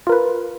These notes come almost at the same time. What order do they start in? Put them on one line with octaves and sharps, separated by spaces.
F4 A#4 B4